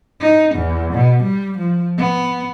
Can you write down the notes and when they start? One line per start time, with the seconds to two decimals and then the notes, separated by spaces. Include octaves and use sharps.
0.21 D#4
0.55 E2
0.93 B2
1.23 G3
1.58 F3
1.98 B3